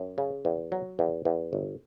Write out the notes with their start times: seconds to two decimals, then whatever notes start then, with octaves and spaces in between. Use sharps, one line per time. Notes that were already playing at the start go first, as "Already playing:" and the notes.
Already playing: F#2
0.18 C#3
0.45 E2
0.72 F#3
0.99 E2
1.25 E2
1.53 G1